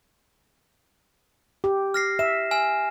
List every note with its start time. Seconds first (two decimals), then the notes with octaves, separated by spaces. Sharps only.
1.64 G4
1.94 F6 A#6 C7
2.19 E5 E7
2.51 G#5 F6 E7